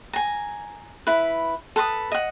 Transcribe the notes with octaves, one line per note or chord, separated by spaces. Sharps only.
G#5 A#5
E4 B4
A4 B4 B5 D#6
D#5 F#5